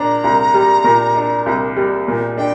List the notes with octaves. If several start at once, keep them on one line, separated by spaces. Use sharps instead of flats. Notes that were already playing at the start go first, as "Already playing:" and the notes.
Already playing: A#2 D4 A#5
C2
G3
A#2
D4
C2
G3
A#2
D4 G5